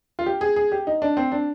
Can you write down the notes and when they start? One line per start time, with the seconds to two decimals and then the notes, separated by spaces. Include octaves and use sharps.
0.19 F4
0.26 G4
0.41 G#4
0.56 G#4
0.72 G4
0.87 D#4
1.02 D4
1.17 C4
1.32 D4